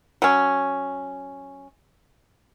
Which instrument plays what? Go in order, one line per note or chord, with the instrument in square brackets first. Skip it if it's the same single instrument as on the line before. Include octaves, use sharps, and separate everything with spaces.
[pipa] F#3 C#4